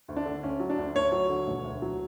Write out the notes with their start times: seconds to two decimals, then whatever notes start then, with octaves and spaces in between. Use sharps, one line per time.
0.08 D2
0.16 D4
0.25 D3
0.43 D2 C#4
0.60 F#3
0.70 D4
0.78 D2
0.94 D2 C#5
1.12 F#3
1.29 D3
1.48 E1
1.64 D2
1.82 F#3